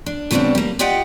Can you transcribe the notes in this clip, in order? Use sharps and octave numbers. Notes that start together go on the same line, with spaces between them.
D4
C#3 G3 A3 B3 C4 D4
G3 A#3
F4 G4 D5 D#5 F#5 G5